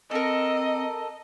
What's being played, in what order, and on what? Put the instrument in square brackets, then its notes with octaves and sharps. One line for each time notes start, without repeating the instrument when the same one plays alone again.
[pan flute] C4 [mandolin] A4 A#4 [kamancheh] D#5